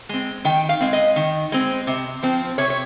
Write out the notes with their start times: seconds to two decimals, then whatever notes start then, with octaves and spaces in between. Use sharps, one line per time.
0.09 G#3 C4
0.45 D#3 G5
0.69 F5
0.81 G#3 C4
0.93 D#5
1.16 D#3
1.52 G#3 C4
1.87 C3
2.23 F3 C4
2.58 C3 C#5
2.70 C#5